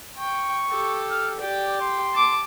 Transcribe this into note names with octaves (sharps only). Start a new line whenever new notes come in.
G5 C#6
G4 A4
F6
G4 D5 G5
C6
A5 D6